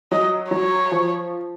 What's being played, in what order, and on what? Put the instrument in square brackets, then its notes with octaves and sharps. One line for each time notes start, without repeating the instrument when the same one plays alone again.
[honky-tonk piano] F#3 [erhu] D#5
[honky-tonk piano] F#3 [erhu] C#5
[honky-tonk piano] F3